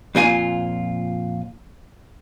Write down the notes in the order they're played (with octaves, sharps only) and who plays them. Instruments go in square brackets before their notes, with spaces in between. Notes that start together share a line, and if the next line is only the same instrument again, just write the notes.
[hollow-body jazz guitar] F2 A#2 F4 G#5